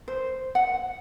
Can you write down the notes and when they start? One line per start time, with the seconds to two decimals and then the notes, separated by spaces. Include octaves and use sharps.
0.08 C5
0.55 F#5